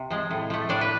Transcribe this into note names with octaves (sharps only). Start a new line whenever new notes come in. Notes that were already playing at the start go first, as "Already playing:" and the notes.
Already playing: C3
F3 G#3
A2
F3 A3
A2 D4 D5
B4